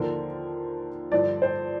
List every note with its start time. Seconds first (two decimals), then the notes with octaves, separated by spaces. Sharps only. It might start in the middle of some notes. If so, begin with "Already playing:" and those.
Already playing: D#2 D3 F3 A#4
1.12 G2 D3 F3 D5
1.42 C5